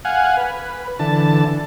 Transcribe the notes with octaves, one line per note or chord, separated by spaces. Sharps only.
F5 F#5 G#5
B4
D3 E3 A5